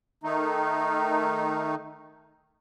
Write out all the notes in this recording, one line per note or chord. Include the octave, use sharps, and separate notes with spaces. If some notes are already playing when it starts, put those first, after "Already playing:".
D#3 A3 D#4